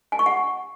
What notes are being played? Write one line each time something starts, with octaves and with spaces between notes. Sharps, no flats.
G#5
C#6
F#5